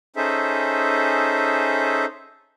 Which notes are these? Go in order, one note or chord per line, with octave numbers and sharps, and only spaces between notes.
C#4 D#4 G#4 A4 C5 E5